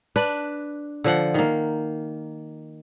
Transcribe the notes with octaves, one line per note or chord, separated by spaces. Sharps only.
D4 B4
D3 F3 F#5
D#3 A#3